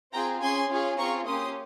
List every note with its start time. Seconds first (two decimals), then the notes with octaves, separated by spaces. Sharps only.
0.13 C4 F4 G#4 G5 A#5
0.41 C#4 G#4 G#5 C6
0.69 C#4 F4 G#4
0.98 C4 F4 G#4 A#5 C#6
1.26 A#3 C#4 G4 C6 D#6